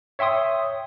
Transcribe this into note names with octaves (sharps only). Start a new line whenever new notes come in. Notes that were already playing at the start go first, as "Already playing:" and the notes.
C#5 E5 G5 C6 D#6